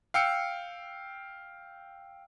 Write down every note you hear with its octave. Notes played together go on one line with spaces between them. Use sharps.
F5 G5 E6 C#7